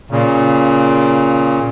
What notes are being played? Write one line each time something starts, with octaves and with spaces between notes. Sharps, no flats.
A#2 C#3